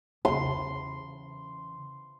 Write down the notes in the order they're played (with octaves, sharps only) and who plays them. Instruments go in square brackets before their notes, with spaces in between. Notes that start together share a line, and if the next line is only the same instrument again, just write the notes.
[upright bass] E2 C#3 [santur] C6